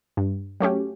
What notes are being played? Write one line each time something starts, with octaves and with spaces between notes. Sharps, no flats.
G2
F#3 A3 C#4 G4